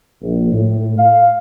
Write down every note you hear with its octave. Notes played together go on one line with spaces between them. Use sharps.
A#1
A2
F5